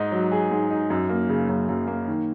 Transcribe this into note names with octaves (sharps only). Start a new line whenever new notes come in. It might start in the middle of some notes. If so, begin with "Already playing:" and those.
Already playing: G#2 D#4
F#3
G#4
G#2
D#4
F#2
A#3
C#3
F#2
F#2
A#3
D#3